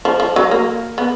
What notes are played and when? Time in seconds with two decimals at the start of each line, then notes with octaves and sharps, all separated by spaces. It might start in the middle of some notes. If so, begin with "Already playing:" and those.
0.05 F3
0.20 F3
0.36 F#3
0.51 A#3
0.98 B3